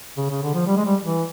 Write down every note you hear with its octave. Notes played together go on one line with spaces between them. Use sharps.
C#3
C#3
D3
F3
G3
G#3
G3
E3